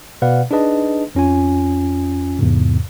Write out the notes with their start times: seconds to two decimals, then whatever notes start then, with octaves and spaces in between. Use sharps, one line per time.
0.22 B2 B4 D5 F5 F#5
0.51 D4 D#4 G#4 B4 D#5 A5
1.15 F2 C#4 F4 G#5
2.39 E2 G#2 C3